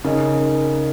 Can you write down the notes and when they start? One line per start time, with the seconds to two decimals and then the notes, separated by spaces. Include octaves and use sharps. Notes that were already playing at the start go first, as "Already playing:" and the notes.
0.04 C#3 D#4 A#4 D#5 G#5